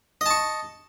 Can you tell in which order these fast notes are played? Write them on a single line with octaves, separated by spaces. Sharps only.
D#5 A5 C#6